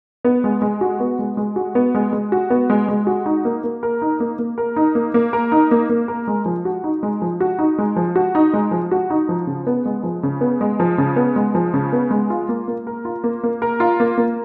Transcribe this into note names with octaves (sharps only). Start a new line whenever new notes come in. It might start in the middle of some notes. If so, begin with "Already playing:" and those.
B3
G#3
G#3
F#4
B3
G#3
G#3
F#4
B3
G#3
G#3
F#4
B3
G#3
G#3
F#4
D#4
A#3
A#3
A#4
D#4
A#3
A#3
A#4
D#4
A#3
A#3
A#4
D#4
A#3
A#3
A#4
G#3
F3
F#4
D#4
G#3
F3
F#4
D#4
G#3
F3
F#4
D#4
G#3
F3
F#4
D#4
F3
C#3
B3
G#3
F3
C#3
B3
G#3
F3
C#3
B3
G#3
F3
C#3
B3
G#3
F4
A#3
A#3
A#4
F4
A#3
A#3
A#4
F4
A#3
A#3